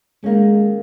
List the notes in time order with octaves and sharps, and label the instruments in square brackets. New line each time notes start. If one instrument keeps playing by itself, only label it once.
[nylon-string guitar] D#3 A#3 C#4 [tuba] G#3